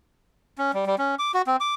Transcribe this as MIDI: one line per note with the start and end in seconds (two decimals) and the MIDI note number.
0.58 0.72 61
0.74 0.85 55
0.86 0.96 55
0.98 1.15 61
1.19 1.32 86
1.34 1.42 66
1.47 1.56 60
1.60 1.75 86